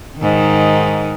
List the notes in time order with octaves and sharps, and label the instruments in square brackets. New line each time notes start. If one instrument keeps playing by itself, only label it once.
[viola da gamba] G#2 D#3